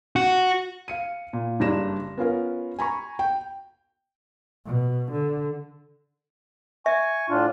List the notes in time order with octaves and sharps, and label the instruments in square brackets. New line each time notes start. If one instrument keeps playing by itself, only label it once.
[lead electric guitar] F#4
[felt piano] F5 C#7 D#7
A#2
F#1 G2 D4 A#6 E7
B3 C#4 F4 A#4
G#5 A#5 B5 C#6
G5
[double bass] B2
D3
[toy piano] E5 [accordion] G#5 C#6
[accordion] A2 D4 F4